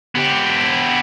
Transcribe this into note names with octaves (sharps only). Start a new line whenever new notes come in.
B3 G4